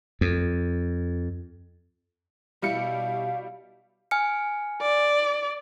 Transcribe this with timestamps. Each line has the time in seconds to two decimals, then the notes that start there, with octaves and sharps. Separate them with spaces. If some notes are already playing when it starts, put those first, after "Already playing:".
0.21 F2
2.62 B2 G3 E4 F5 C#7
4.11 G#5 F6 C#7
4.82 D5